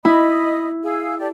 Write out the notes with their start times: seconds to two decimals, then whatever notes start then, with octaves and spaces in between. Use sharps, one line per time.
0.05 E4 D#5 B5 D#6
0.83 G#4 F5 E6
1.19 G4 A4 D5